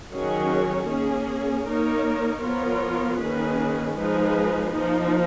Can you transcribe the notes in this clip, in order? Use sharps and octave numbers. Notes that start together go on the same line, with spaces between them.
D#3 F#3 C#4 G#4 C#5
A#3 C#4 G#4
A#3 D#4 A#4 C#5
F3 B3 F4 A#4 C#5
D#3 A#3 C#4 G#4 B4
F3 G#3 D#4 G#4 B4
F3 A#3 D#4